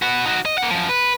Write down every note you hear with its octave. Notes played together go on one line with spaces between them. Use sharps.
B3 F#4
D#4 F#4
D#5
A#3 F#5
F#2 F3
B4